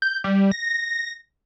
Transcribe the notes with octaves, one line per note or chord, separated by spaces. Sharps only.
G6
G3
A#6